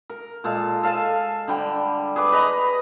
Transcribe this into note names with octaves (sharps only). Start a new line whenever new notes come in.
A#4
A#2 G#3 A4 F5
A4 F5 G#5 A5
D3 G3 G5
G#4 B4 D6
B4 D#5 A#5